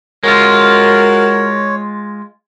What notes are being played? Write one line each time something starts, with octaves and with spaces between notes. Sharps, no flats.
G#3 F4 F#4 A#4 C#5